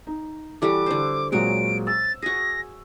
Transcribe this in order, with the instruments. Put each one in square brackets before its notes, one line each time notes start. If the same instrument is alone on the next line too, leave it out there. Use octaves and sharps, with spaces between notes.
[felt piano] D#4
[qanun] E3 G3 F#4 [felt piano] A4 [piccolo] D6
[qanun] D3 C5
[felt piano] A#2 F#3 G#3 [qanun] C4 F#4 C#5 [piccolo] D7
[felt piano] E6 [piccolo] A6
[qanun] F#4 G#4 [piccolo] A#6